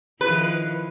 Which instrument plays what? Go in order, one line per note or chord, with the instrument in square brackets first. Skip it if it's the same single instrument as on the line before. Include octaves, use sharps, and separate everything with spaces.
[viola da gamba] D#3 F3 E4 [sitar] B4